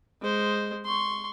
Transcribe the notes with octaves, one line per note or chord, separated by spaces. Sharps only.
G#3 C5
C6 C#6